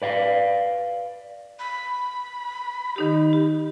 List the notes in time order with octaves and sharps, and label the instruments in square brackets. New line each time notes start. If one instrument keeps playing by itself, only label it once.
[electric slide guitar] B4 D5 F5
[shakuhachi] B5
[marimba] D#3 D#4 G4
G4